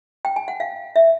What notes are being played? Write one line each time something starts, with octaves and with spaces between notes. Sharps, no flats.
G5
G#5
F#5
F5
E5